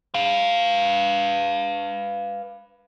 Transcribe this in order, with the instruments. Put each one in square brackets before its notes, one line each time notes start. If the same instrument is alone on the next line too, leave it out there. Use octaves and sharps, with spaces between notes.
[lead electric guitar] B4 F5